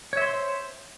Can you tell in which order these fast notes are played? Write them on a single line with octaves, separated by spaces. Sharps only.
C#5 E5 C6 C5